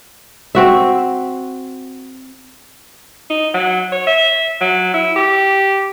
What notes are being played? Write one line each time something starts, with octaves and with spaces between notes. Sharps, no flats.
C4 F#4 E5
D#4
F#3
C#5
E5
F#3
E4
G4